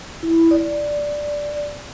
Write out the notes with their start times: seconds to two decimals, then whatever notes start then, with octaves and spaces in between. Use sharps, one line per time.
0.23 E4
0.51 D5